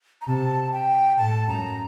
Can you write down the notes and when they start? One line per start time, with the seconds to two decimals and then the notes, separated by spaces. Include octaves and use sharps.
0.22 A#5
0.27 C3 A5
0.72 G5
1.18 A2 A5
1.48 F#2 A#5